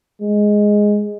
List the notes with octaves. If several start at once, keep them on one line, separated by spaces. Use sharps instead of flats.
G#3